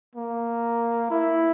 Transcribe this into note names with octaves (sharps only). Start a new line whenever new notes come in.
A#3
E4